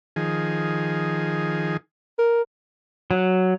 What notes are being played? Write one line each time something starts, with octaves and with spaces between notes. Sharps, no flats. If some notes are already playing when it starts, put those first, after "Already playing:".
D#3 F3 G#4
A#4
F#3